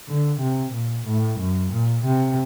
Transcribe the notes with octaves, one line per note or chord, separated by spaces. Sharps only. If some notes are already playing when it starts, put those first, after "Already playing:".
D3
C3
A#2
A2
F#2
A#2
C3